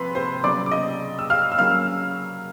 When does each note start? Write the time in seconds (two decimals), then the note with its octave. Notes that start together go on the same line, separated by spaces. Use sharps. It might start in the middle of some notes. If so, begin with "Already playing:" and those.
Already playing: C3 F3 B4 B5 C6
0.15 C5 C6
0.43 C#3 F#3 B3 D5 D6
0.66 D6
0.71 D#5 D#6
1.19 E6
1.30 F5 F6
1.52 E6
1.58 C#3 F#3 A#3 C#4 F5 F6